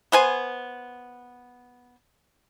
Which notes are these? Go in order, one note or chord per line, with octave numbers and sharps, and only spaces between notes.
B3 C5 G#5